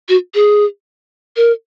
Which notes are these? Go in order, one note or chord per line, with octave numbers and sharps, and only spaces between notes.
F#4
G#4
A#4